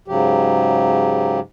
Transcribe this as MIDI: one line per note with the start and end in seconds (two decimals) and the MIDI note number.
0.08 1.39 44
0.08 1.39 49
0.08 1.39 54
0.08 1.39 67